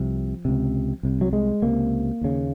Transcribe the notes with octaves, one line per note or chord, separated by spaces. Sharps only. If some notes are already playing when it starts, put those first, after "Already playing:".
Already playing: C2 C3 F3
C#2 C3
C2 C3
F#3
G#3
C#2 C3 A#3
D#2 C#3